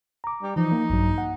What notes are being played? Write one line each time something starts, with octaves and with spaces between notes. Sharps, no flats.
A#5 D6
G3
E3 F3 D#4
A#3
A#1 G2 F#3
F#5